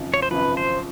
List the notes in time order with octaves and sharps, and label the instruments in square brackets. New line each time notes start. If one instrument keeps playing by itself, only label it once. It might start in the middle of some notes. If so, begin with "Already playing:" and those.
Already playing: [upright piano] G#1 F#2 C#3 F3
[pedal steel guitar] C#5
C5
[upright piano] G#1 F#2 C#3 F3 [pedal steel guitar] B4
[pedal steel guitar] C5